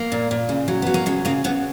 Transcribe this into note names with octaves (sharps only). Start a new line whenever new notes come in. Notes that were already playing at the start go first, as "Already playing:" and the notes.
Already playing: A#3
A#2
A#2
C#3
F#3
F#3 B3
A#3
C#3 G#3
C#3 A#3
C#3 B3